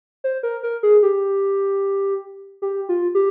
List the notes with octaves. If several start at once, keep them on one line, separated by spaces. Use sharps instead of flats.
C5
A#4
A#4
G#4
G4
G4
F4
G4